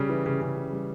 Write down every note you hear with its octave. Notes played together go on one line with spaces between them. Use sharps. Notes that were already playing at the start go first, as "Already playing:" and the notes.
Already playing: C#3 G3
E3
C#3
C#3
C#3
G3